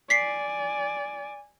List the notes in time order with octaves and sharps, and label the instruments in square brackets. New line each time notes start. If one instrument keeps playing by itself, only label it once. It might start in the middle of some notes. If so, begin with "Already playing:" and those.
[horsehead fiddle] D5 G#5 [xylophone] B6 C7